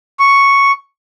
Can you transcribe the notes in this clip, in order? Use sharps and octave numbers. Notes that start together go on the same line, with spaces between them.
C#6